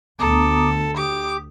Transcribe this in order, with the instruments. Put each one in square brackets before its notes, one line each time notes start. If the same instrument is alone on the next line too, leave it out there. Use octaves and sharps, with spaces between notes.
[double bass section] D2 [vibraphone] B3 A#5 D#6 [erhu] A4 [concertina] D6
[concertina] G4 [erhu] D6 [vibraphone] D#6